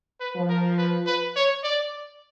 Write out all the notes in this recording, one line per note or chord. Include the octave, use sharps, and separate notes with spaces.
B4
F3
A#4
B4
B4
C#5
D5